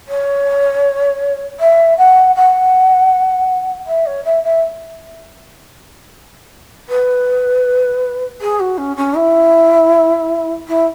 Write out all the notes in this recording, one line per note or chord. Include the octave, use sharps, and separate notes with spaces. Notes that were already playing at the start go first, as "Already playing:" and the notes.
C#5
E5
F#5
F#5
E5
C#5
E5
E5
B4
G#4
F#4
C#4
C#4
E4
E4